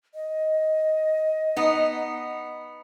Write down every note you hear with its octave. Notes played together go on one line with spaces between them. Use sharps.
D#5
B3 D#4